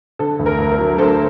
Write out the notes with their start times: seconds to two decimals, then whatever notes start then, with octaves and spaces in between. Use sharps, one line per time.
0.19 D3 A4
0.39 D2
0.46 A#4
0.58 D2
0.72 A#4
0.78 F#3
0.98 D3 A4 C5